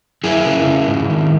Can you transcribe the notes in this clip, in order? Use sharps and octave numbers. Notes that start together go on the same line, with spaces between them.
F#2 E4 G#4
C#3
C#3
G#2
D#3